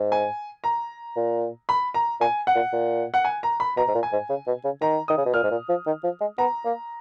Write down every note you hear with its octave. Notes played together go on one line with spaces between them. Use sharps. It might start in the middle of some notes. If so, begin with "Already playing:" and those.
Already playing: G#2
G#5
A#5
A#2
B5
A#5
A#2 G#5
F#5
A#2
A#2
F#5
G#5
A#5
B5
B2 A#5
G#2
A#2
G#5
G#2
C#3
B2
C#3
D#3 A#5
D#3 D#6
C#3
B2
A#2 F6
G#2
A#2
F3
D#3
F3
G#3
B3 A#5
A#3